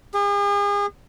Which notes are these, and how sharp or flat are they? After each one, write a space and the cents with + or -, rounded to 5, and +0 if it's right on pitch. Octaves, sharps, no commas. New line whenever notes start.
G#4 -40